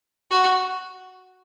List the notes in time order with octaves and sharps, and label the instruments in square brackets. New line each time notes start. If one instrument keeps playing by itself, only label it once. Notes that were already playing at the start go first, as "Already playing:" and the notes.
[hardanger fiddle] F#4